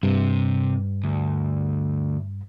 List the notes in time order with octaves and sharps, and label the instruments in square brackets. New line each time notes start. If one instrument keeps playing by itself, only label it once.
[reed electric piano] G2 [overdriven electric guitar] C3
[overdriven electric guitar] D2